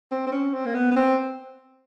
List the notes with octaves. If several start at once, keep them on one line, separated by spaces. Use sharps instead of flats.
C4
C4
C#4
C4
A#3
B3
B3
C4